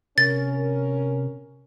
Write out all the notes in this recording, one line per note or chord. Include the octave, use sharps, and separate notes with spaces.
C3 C#4 A#4 A6